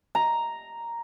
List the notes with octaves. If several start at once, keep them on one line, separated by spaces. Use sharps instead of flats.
A#5